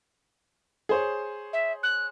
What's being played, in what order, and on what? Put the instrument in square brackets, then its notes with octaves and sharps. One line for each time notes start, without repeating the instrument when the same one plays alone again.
[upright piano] G#4 C5 C#5
[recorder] E5
F#6